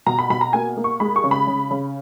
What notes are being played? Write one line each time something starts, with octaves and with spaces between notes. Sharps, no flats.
B2 A#5
B5
B2 B5
A#5
A#3 G#5
A#3
C#6
G#3 B5
C#6
C#3
B5
C#3
C#3